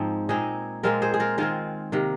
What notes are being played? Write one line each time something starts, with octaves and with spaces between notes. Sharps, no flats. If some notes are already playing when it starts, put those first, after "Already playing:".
Already playing: G#2 F3 G#3 C4 D#4
A#2 G#3 C4 D#4 G#4
A#2 G#3 C4 F4 A#4
G#4 C5
G#4
F4 A#4
D#3 G#3 C4 F4 A#4
C3 D#3 A#3